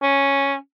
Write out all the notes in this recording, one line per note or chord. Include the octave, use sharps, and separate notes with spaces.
C#4